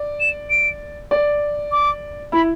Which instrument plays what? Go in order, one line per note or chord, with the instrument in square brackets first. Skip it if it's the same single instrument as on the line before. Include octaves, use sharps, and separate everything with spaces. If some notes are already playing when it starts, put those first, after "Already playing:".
Already playing: [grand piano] D5
[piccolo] E7
D7
[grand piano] D5
[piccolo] D6
[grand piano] E4 [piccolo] B5